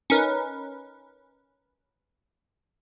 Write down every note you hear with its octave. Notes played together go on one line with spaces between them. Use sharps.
C#4 D#4 A#4 B4